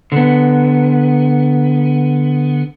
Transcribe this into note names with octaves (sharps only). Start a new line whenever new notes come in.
D3 B3